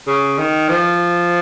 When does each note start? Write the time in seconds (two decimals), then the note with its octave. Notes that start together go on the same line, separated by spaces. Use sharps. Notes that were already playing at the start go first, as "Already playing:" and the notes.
0.07 C#3
0.38 D#3
0.69 F3